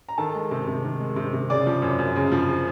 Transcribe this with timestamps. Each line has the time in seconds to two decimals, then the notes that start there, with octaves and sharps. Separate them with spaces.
0.09 A#5
0.18 D#3 A4 A5
0.35 G#3
0.51 C3
0.67 C3
0.84 D#3
1.00 G#3
1.16 C3
1.33 C3
1.50 C#3 D5 D6
1.67 F3
1.82 F#2
1.99 F#2
2.16 C#3
2.32 F3